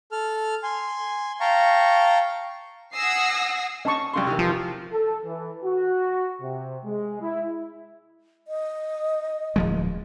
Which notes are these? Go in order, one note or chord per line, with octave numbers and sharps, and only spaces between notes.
A4 F6
G#5 C6
F5 G5 A5 A#5 C#6
F#5 G#5 D#6 E6 A#6 C7
C#4 D#5 A5 C#6
C2 C#3 C6
C3 D#3 E3
F3
A4
E3
F#4
C3
G#3
E4
D#5
D1 F3 G#3